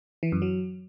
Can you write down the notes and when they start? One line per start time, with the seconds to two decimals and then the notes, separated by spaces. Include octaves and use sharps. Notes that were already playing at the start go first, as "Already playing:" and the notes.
0.23 E3
0.32 F#2
0.42 F#3